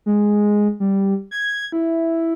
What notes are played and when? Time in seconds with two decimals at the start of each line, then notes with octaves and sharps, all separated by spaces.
0.06 G#3
0.80 G3
1.31 G#6
1.72 E4